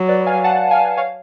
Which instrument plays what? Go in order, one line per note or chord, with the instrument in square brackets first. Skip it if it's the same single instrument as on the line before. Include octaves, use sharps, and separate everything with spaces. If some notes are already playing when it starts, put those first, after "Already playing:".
Already playing: [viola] F#3
[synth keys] B4 D5
F5 G#5
F#5 A5
F5 G#5
C#5 F5